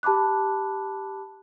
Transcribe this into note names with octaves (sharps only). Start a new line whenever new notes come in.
G4 A5 B5 D6 F#6